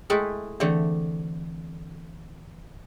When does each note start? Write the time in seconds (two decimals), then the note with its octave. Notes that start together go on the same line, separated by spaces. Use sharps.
0.10 G#3 A3 E4 G5
0.60 D3 E3 A3 C4